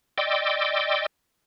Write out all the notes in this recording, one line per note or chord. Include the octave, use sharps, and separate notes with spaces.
D5 D#5 G5 C6 D6 E6